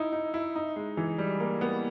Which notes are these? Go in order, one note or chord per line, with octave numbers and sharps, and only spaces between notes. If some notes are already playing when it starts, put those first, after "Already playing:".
Already playing: D#4 E4
D#4
E4
D#4
G#3
E3
G3
A#3
B3